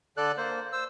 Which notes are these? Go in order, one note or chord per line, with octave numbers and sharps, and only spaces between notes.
D3 A4 D5 F#6
A#3 C5
C5 E6